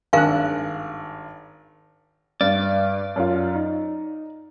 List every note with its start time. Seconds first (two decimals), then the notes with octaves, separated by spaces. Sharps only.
0.13 G#1 G2 A#4 F5 G#5 F#6
2.41 G2 D5
3.16 F#2 F4
3.55 D#4